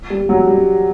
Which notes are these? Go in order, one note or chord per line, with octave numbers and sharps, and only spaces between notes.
G3
F#3
G3